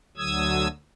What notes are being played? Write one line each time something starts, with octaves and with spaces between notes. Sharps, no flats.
D2 D3 F#3 D#6 E6 G#6